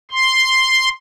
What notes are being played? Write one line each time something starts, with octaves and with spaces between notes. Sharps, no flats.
C6